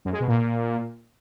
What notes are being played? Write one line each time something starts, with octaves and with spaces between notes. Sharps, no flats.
F#2
G#3
B2
A#2